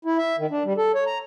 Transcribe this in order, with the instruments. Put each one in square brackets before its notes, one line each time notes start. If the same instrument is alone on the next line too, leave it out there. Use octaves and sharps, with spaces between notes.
[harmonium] E4
E5
D#3
D4
G3
A4
C#5
A#5